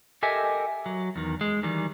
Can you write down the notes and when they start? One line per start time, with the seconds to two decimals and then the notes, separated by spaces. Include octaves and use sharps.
0.23 G4 A4 A#4 D#5 E5 G#5
0.86 F#3
1.16 E2 D#3
1.41 G#3
1.63 D#3 E3 G3